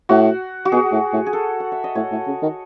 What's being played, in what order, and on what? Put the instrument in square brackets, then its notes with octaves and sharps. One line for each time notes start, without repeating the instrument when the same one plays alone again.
[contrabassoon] A2 [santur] F#4
[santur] F#4
[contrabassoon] B2 [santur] G#4
[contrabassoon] A2
A2
[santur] G#4
A4
F#5
E5
D#5
[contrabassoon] A2 [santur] C#5
[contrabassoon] A2
C#3
D#3